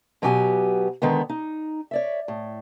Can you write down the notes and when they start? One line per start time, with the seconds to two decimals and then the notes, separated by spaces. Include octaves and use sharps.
0.22 B2 F#3 B3 G4 C#5 G#5
1.02 D3 D#3 G#3 B3
1.29 D#4
1.91 C#5 D5 E5
2.28 A2